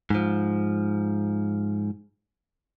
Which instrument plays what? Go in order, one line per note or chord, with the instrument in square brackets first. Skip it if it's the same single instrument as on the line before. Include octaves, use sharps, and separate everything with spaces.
[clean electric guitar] G#2 F3